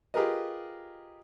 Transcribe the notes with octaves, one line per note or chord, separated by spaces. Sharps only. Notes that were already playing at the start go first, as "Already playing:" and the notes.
F4 G4 G#4 A#4 B4 D#5